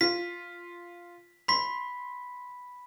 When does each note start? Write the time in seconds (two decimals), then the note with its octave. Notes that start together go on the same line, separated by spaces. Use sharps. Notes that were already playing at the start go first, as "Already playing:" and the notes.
0.01 F4 B6
1.48 B5 C6 B6